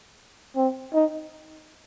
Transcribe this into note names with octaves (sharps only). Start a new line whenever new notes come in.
C4
D#4